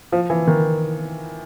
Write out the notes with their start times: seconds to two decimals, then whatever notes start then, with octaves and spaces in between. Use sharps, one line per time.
0.12 F3
0.30 E3
0.47 D#3